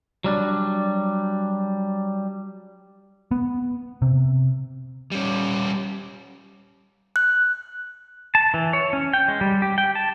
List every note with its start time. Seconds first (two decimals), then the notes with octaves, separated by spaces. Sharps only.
0.24 F#3 G3 D4
3.31 B3
4.02 C3
5.12 G3 C#4
7.16 F#6
8.35 A5
8.54 E3
8.73 C#5
8.93 C#4
9.14 G5
9.28 G#3
9.41 G3
9.62 G4
9.78 G5
9.95 A5